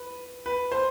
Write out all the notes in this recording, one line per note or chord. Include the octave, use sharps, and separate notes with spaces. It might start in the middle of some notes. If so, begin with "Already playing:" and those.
Already playing: B4
B4
C5